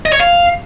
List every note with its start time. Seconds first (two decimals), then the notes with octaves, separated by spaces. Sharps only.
0.06 D#5
0.13 C#5
0.20 F5